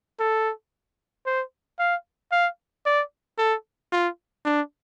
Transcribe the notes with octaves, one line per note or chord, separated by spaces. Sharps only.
A4
C5
F5
F5
D5
A4
F4
D4